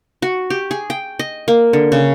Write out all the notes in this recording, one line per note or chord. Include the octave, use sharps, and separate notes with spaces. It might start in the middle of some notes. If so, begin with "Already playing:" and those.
F#4
G4
G#4
G5
D#5
A#3
D3
C#3